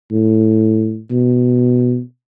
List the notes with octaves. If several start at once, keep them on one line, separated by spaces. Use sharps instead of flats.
A2
B2